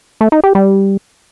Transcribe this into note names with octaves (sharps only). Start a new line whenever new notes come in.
A3
D#4
G4
G3